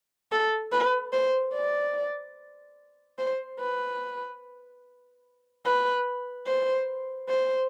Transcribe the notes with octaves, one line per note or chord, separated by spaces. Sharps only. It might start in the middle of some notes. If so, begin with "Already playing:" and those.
A4
B4
C5
D5
C5
B4
B4
C5
C5